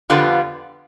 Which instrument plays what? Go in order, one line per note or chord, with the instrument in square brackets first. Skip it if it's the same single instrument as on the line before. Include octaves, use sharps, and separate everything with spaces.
[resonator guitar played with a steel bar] F2 D3 G3 B3 F4